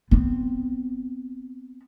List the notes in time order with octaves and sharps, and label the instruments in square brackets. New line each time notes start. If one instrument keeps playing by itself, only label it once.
[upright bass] B3 C4